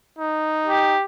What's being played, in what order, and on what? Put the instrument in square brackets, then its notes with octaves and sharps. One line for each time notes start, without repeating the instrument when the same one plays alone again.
[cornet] D#4
[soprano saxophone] G4